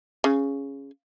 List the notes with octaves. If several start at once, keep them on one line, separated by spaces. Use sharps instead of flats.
C#3